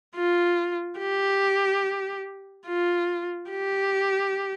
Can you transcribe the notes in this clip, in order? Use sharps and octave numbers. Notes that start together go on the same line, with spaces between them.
F4
G4
F4
G4